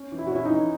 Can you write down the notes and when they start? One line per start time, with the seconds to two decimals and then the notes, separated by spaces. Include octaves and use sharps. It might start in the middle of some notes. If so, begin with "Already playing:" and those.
Already playing: C#4
0.12 E3
0.18 E4
0.27 F#4
0.32 C#4 E4
0.45 D#4
0.51 E3